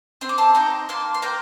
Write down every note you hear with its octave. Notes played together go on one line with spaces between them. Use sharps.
C4 C6
D6
A5 C6
D#4 G5 A#5
A#3 A5 C6
C6
A#3 G5 A#5